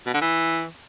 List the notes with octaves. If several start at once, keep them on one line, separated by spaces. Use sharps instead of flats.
B2
D3
E3